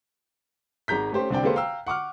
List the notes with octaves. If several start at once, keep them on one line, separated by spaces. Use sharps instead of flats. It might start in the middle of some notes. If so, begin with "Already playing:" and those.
G#1 G#3 A#5 G6 B6
A3 C#4 G4 C5
C2 D3 C4 D5 G5
G#3 A#3 G4 A4 B4 C5
F5 G5 A#5 E6
F#5 C#6 D6 F6